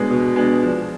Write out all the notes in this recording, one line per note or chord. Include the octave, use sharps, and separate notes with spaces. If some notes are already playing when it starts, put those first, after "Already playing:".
Already playing: B2 G#3 B3 D4
B2
G#3 B3 D4
F3